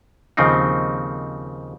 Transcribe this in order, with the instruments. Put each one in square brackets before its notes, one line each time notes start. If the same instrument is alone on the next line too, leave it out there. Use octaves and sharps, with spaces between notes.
[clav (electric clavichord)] D#2 C#3 F3 C4 D#4